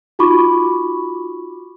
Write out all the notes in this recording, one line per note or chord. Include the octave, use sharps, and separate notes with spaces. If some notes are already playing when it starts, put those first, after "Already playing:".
D#4 F4 F#4 B5 C#6 D6